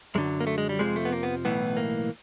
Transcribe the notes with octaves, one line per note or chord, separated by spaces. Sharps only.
F#2 D3 F#3 G#3
A#3
A3
G#3
G3
F2 C3 F3 G#3
A3
B3
A#3
B3
B1 A2 E3 B3
A#3